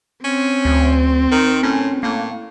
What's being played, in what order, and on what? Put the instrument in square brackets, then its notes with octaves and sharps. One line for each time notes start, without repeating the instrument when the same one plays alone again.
[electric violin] C4 [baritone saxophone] C#4
[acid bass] D2
[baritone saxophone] D#3
[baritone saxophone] A2 [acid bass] C#4
[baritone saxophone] A2 [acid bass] A#3